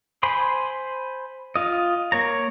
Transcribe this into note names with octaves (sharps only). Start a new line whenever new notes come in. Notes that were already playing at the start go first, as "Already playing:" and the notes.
C5 G#5 B5 C6
F4 D#5
A#3 C#5 A#5